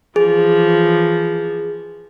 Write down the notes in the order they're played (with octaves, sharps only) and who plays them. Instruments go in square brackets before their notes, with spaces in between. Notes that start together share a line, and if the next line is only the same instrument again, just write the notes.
[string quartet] E3 F3 [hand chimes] G#4